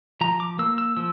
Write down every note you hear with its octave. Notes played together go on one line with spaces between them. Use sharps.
F3 A#5
D6
A#3 E6
E6
F3 E6